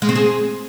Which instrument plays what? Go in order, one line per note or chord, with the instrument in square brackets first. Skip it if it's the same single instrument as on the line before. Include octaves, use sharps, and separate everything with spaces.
[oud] G#3
C4
G#4